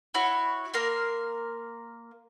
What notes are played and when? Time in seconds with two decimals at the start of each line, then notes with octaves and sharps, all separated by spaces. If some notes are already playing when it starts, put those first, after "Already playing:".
0.14 E4 F#4 C#5
0.74 A#3 A#4 C6